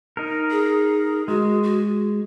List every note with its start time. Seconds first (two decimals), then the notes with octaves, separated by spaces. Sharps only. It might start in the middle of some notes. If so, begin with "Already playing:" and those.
0.17 D#4 A#4
0.51 G#4
1.28 G#3 F#4
1.63 F#4